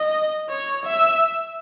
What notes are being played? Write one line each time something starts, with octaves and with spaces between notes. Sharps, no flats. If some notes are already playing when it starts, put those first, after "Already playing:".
Already playing: D#5
C#5
E5